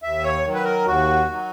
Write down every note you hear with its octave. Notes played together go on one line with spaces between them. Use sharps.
D#2 E5
C#5
D#3 F#3
B4
A#4
D#2 F#4
D#3 F#3